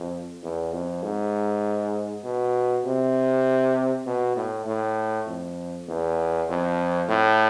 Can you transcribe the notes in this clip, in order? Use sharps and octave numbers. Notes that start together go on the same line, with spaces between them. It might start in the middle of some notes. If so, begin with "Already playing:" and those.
Already playing: F2
E2
F2
G#2
B2
C3
B2
A2
A2
F2
E2
F2
A2